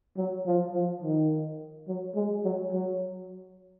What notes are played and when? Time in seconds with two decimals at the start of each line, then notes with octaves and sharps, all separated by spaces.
0.17 F#3
0.46 F3
0.73 F3
1.02 D#3
1.88 F#3
2.15 G#3
2.44 F#3
2.72 F#3